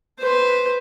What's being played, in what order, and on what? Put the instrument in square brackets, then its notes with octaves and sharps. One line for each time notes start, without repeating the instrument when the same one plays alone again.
[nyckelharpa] B4 C5